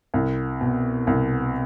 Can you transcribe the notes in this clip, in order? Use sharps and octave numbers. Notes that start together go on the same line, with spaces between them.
C2
B2
C2